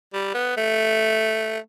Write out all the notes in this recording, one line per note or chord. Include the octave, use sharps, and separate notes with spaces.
G3
B3
A3